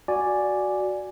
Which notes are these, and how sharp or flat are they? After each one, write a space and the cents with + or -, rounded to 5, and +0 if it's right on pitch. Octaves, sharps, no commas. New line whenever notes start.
F#4 +0 D5 +0 G#5 +0